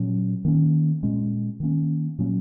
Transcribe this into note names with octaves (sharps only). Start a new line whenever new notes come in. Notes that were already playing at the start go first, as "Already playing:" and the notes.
Already playing: A#2 F#3 C#4
D#3 A#3 C#4
A#2 G#3 C#4
D#3 A#3 C#4
A#2 F#3 A#3 C#4